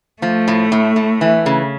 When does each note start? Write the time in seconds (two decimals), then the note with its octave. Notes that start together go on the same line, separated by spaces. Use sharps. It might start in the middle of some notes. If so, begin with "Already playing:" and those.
0.22 F3 A3
0.48 A2
0.72 A2
0.96 A2
1.21 E3
1.46 C#3